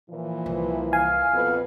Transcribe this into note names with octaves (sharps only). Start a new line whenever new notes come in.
A#2 E3 F3
C2
F5 G#5
F2 B2 B3